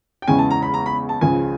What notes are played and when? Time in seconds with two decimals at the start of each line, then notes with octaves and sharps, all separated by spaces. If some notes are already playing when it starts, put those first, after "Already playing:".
0.22 G5
0.28 E2 C#3 E3 G#3 C#4 G#5
0.39 A5
0.51 A#5
0.62 B5
0.74 A#5
0.86 B5
1.09 A5
1.21 C#2 C#3 F3 G#5